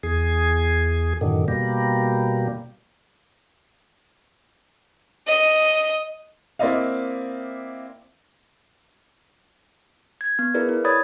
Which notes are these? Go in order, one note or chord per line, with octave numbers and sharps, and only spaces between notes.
E2 G#4
F#2 A2 D3 D#3
B2 G3 A#3
D#5
A#3 C4 E4 D5 D#5 F5
G#6
B3
E4 G#4 A#4 B4 D5
E4
C#5 D5 B5 D#6 G#6 A6